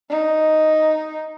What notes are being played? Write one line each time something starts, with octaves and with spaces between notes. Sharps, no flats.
D#4